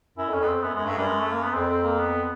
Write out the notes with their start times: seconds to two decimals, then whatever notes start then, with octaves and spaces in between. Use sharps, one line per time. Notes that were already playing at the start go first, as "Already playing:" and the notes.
0.18 F#2 E4
0.29 F2
0.33 C#4
0.40 F2 B3
0.48 C4
0.63 F#2 B3
0.75 F#2 G#3
0.85 G2 A3
0.97 F#2 G3
1.08 G#3
1.20 A3
1.32 A#3
1.42 B3
1.54 F2 C4
1.70 C4
1.83 A#3
1.99 B3